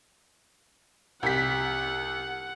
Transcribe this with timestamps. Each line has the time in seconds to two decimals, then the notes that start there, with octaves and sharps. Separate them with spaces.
1.23 C2 F#5 B6